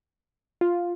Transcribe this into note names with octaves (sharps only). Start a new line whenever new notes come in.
F4